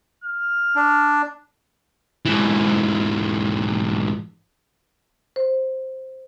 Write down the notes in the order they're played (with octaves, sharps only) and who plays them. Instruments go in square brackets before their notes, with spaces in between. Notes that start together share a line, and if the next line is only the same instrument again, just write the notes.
[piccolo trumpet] F6
[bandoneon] D4
[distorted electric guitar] G#2 E3
[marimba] C5